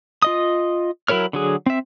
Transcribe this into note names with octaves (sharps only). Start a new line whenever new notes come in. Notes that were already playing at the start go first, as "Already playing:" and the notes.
F4 D#5 D#6
F#3 E4 A#4 C#5 F6
D3 F#3 G#4
C4 E5